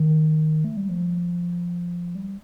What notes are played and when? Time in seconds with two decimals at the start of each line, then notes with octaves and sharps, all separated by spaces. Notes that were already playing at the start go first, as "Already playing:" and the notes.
Already playing: D#3
0.64 A3
0.77 G3
0.89 F3
2.15 G3